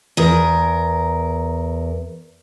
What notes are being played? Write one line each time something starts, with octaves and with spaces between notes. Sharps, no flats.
E2 A#4